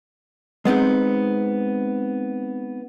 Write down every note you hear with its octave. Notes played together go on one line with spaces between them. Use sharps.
G#3 B3 C4 D#4